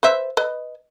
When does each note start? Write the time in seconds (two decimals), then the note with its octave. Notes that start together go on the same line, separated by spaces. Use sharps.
0.03 B4 C5 E5
0.37 B4 D#5